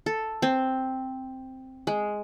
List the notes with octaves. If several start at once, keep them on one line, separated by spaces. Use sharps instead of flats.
A4
C4
G#3